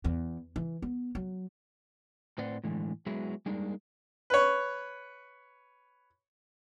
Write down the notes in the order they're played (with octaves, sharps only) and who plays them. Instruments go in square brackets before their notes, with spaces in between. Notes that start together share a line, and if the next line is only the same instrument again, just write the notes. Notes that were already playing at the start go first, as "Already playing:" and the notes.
[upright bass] E2
E3
B3
F#3
[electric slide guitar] A2 C4 B4 C5 D5 F#5
A2 D3 E3 G#3
F#3 G#3 B3 E4 F#4 G#4
G3 G#3 A#3 D4 D#4
[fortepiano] B4 C#5